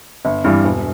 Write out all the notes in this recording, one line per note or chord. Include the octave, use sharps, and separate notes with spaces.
G1
G2 E3 G3
E1